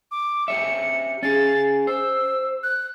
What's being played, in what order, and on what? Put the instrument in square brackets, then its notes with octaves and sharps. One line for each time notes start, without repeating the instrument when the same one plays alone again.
[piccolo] D6
[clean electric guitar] G4 C#5 E5 [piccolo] C#7
[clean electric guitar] C#4 G#4 [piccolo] A6
[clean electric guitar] C5 [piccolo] E6
[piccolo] F#6